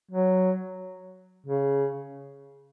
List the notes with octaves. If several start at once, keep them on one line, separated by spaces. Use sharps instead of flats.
F#3
C#3